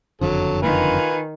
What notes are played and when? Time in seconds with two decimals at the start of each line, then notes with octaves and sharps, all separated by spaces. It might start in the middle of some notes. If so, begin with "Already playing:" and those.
0.21 F#1 F2 D3 F#3 A4
0.62 D#3 F4 B4 G#5